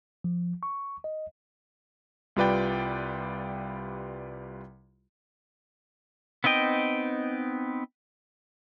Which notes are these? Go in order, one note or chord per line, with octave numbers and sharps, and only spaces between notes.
F3
C#6
D#5
C2 G3 F4 B4 D5 G5
B3 C4 D#4 D#5 G5